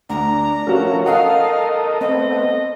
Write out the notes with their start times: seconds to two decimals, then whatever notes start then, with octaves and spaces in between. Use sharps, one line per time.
0.10 D2 D4 A#5
0.67 F3 A3 C#4 F#4 A#4
1.06 A4 A#4 D#5 F5 F#5 D#6
2.01 A3 B3 C4 D#5